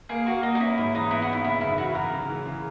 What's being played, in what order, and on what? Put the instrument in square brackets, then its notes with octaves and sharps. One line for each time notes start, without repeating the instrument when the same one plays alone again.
[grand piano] A#3 [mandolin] G#4
[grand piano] A#3 [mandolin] F#4
[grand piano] A#3 [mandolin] D#4
[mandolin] D#4
[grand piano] C#4 [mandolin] E4
[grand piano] G#2 [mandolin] E4
[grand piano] E3 [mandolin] D#4
[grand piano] B3 [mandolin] E4
[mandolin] F#4
[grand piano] D#4 [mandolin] E4
[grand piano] C#3 [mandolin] E4
[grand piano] F#2 [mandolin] E4
[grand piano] E3 [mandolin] F#4
[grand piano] C#3 [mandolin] A#4
[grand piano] C#3
E3
C#3